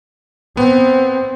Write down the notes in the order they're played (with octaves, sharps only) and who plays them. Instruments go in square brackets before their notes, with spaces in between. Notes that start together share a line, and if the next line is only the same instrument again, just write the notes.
[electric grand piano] B3 [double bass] C4